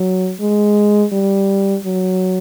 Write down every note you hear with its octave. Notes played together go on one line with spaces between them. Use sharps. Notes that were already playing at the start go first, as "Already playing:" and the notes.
Already playing: F#3
G#3
G3
F#3